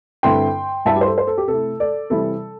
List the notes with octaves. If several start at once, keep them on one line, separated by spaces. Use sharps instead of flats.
G2 D3 C4 E4 G5 C6
G2 G3 E4 E5 A5
G4
C5
A4
C5
A4
G4
C3 A3 E4 A4
A4 D5
C3 E3 G3 C4 E4 A4